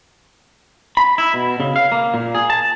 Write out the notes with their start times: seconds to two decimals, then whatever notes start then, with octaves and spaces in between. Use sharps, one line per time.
0.97 B5
1.18 E4
1.34 B2
1.60 C#3
1.76 F5
1.92 A#3
2.14 A#2
2.35 G#4
2.50 A5